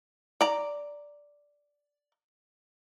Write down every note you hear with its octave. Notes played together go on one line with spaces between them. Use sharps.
D5 A#5